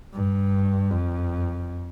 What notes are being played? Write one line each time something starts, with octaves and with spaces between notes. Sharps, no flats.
G2
F2